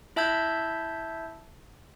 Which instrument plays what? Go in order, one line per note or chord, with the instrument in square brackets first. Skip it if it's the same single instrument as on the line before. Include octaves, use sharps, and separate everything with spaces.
[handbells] E4 E5 A5 E6 G6 G#6